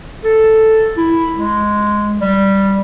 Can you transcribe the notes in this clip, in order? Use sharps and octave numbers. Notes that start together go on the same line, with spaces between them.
A4
E4
G#3
G3